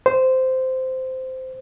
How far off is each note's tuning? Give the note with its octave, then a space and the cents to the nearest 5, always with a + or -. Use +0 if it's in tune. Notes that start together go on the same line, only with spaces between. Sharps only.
C5 -10